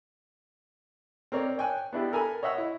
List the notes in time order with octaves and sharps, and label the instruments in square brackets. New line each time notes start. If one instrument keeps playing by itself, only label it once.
[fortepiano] C4 A#4 C#5 D5
C#5 G5 G#5 F#6
B3 D4 E4 G4
A4 A#4 G#5 B5
C#5 D#5 E5 F#5 C#6
E4